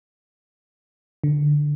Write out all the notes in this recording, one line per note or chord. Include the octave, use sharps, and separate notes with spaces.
D3